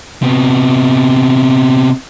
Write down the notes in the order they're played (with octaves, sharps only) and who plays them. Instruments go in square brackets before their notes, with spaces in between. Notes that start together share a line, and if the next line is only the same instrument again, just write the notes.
[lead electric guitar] C3 B3